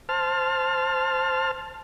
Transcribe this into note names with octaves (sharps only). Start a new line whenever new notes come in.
C5 A5 F6